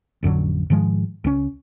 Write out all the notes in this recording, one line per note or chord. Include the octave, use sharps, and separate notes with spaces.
A1 F2 D3 F#3
G#2 D#3 F3 G#3
C#2 C#4